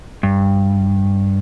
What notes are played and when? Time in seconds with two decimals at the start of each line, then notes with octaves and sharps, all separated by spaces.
0.23 G2